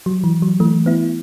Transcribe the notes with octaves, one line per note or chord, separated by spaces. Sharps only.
F#3
E3
F#3
E3 A3
B3 E4